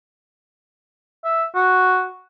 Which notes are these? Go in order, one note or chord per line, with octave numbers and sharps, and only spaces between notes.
E5
F#4